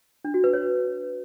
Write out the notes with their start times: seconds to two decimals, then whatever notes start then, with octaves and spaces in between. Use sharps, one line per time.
0.25 D4
0.34 F#4
0.44 B4
0.53 C#5